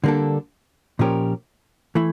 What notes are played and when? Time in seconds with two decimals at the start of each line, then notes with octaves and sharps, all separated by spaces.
0.04 D3 G3 A#3 D4 A4
0.99 A#2 F3 C#4 G4 A#4
1.95 E3 A3 E4